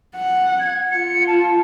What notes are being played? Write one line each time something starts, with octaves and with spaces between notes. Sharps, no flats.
F#5
G#6
F4 C#7
A5